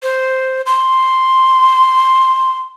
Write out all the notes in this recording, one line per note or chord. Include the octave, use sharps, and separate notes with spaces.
C5
C6